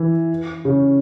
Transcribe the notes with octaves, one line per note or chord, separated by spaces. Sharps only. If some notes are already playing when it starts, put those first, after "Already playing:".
Already playing: E3
C#3